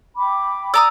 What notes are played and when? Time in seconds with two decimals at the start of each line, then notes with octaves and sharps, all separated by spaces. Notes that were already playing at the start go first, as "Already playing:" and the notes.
0.18 G5 B5 D6
0.74 D5 A#5 D#6 E6